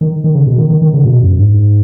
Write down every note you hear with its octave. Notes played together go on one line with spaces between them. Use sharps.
D#3
D#3
C#3
B2
D#3
D#3
D#3
C#3
A#2
B2
F#2
G#2